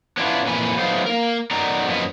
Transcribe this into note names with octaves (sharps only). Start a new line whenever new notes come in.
B3 C#4 D4 E4 F4
F2 A#2 E3 A#3 B4 G#5
F#3 A3 B3 D#4 C5 F5
A#3 A#4
F#3 B3 D#4 A#4 D5 A#5
F#2 F3 A#3 F#4 B4 D#5